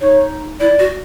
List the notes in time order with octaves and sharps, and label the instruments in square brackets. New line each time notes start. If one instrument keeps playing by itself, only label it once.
[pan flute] D#4 [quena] C#5
[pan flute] E4 [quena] D5
[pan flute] F#4